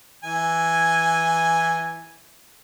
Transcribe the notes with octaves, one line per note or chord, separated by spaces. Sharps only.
E3 G#5